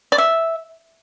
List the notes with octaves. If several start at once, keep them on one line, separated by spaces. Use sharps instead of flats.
D5
E5